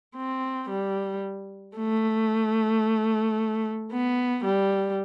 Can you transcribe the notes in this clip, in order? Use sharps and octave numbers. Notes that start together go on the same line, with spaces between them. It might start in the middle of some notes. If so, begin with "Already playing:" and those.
C4
G3
A3
B3
G3